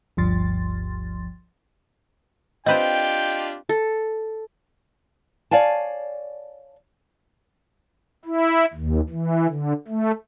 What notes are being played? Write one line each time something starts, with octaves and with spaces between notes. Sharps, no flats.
G1 D2 G2 F3 C6 A6
C4 D4 F4 G4 B4 C5 D#5 G5
A4
C#5 D5 F5 G#5 A5
E4
D#2
E3
D3
A3